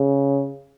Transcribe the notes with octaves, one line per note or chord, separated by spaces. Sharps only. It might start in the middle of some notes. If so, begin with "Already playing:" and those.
Already playing: C#3